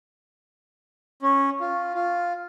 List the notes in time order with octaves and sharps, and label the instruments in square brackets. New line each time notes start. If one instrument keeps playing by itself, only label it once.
[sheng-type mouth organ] C#4
F4
F4